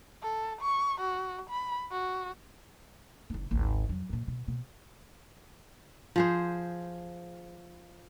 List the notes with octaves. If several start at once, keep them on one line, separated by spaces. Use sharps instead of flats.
A4
C#6
F#4
B5
F#4
F#1 D#4
G#1 D2
F2 F#3
F#2 A#2
B2
B2
F3 G#4 C5